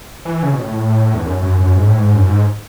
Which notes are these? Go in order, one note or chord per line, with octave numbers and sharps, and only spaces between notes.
E3
C#3
B2
A2
E2
F#2
F#2
F#2
G#2
A2
G#2
F#2
G#2